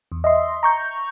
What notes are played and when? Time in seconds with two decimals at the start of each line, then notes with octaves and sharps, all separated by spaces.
0.12 E2
0.24 D#5 E5 C6
0.63 A#5 C#6 G6